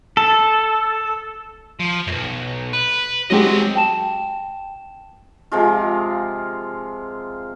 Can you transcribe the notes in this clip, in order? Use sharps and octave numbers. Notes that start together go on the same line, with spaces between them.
A4
F3
B1 F#2
B4
F#3 G#3 C4 G4 D#5
G5 A5 E7
C3 F3 G#3 F4